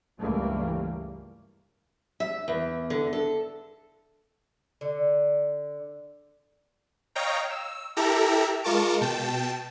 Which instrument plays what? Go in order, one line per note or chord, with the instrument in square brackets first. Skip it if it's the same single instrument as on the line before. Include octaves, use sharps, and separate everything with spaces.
[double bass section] C#2 G2 E3 G3 A3 A#3
[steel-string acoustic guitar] E5
E2
D3
A4
[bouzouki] D3
[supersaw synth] C#5 D#5 F5 G5 A#5
E6
E4 G4 A4 A#4 E5 A#5
G#3 F4 A#4 A5 C#6 D6
B2 G5 A5